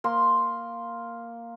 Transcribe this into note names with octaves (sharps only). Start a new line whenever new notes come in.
A#3 C6